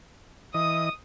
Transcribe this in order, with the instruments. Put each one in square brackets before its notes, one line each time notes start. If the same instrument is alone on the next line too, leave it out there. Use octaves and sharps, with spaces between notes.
[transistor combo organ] E3 D#5 [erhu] D#6